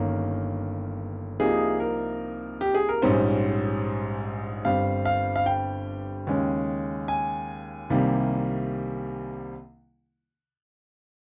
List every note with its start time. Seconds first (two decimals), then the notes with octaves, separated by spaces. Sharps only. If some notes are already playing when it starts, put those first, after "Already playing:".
Already playing: G1 G2 D#3 A#3 C#4
1.40 C2 C3 F3 A#3 D#4 G#4
1.80 A#4
2.61 G4
2.75 G#4
2.89 A#4
3.02 A#1 G#2 G3 C#4 C5
4.65 G1 G2 G3 C4 F5
5.05 F5
5.36 F5
5.46 G5
6.27 D#2 C#3 G#3 C#4
7.08 G#5
7.90 C2 C3 D#3 G3 A#3